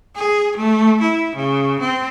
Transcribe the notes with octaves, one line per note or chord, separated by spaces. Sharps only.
G#4
A3
E4
C#3
C4